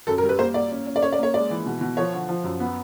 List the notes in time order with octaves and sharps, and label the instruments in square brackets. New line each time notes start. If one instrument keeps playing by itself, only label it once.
[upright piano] F#2 [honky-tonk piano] A4
[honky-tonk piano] A#4
[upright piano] G3
[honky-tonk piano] B4
[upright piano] A#3 [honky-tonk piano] C5
[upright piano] A#3 [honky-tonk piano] D5
[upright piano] C#4
C#4
[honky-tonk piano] D5
[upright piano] C#4 [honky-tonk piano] C#5
[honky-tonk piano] D5
[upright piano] A#3 [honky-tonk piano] C#5
[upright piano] G#3 [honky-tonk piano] D5
[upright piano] E3
B2
B2
[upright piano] F3 [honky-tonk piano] C#5
[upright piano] D3
F3
F#2
B3